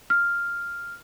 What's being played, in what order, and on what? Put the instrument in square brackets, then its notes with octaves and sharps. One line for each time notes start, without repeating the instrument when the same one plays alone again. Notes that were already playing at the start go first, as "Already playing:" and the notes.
[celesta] F6